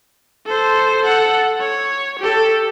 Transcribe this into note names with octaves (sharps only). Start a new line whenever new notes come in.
A4 C5
A4 F#5
C#5
G4 A4